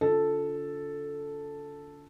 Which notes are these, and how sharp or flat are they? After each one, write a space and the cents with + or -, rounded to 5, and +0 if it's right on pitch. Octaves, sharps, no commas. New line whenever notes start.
D3 -35 F4 +15 A4 +0